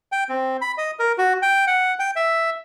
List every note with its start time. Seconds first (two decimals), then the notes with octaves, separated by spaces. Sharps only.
0.12 G5
0.29 C4
0.61 B5
0.78 D#5
0.99 A#4
1.18 F#4
1.42 G5
1.67 F#5
1.99 G5
2.16 E5